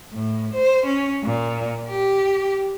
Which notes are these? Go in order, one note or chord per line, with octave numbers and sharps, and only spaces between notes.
A2
C5
C#4
A#2
G4